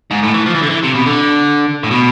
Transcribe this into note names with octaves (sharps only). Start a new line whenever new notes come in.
G#2
A2
E3
F3
E3
D3
E3
C3
B2
D3
A2
B2